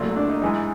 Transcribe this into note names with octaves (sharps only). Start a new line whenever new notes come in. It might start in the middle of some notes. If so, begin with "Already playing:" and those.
Already playing: C2 A#2 F#3 A3
D4
D#4
G#2 E3 G#3 D#4